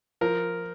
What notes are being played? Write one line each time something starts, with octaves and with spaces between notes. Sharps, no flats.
F3 A#4